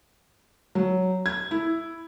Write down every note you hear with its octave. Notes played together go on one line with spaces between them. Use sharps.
F#3
G#6
E4